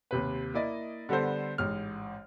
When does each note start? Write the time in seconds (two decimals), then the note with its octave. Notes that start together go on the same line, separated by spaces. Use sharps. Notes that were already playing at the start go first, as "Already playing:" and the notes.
0.11 D#2 C3 B4
0.54 A#3 E4 D5 D#5
1.09 D3 G3 B3 A4 C5
1.58 A1 G#2 F6